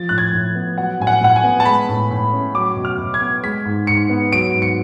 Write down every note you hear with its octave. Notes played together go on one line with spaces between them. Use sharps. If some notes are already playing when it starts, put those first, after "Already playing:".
Already playing: F3 A6
A2 F#6
G#6
A2
B3
F#3 F#5
A2 G#5
F#5
A2 F#5
G#5
B3
A5
G#3 B5
A2
A2
C#4
F#3 D6
B2
F6
B2
G#6
B3
G#3 B6
G#2
G#2 C#7
B3
F#3 D7
G#2
C#7